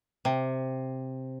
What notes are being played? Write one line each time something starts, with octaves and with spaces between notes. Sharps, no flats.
C3